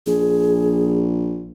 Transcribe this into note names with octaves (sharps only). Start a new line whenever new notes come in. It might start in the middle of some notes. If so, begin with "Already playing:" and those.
A#1 G#4